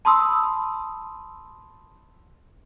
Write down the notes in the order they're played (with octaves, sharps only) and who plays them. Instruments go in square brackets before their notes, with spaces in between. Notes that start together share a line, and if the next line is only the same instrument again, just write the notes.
[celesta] A5 B5 C6 D#6 E6